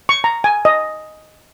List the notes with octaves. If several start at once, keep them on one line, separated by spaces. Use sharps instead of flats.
C#6
A#5
G#5
D#5